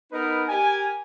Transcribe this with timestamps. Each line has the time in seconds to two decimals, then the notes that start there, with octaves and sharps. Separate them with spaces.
0.12 B3 D#4 A#4 B4
0.48 G4 A#4 G#5